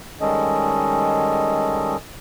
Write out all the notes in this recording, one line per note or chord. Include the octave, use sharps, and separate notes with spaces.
D#3 G3 G#3 C#4 A4 D#5